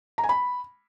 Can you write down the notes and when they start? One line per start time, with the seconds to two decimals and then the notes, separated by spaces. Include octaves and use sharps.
0.18 A#5
0.24 G#5
0.29 B5